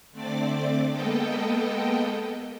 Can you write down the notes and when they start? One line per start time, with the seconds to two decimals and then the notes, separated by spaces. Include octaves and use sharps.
0.12 D3 A3 C4 D5 D6
0.90 G#3 A#3 B3 A4 D#5 G5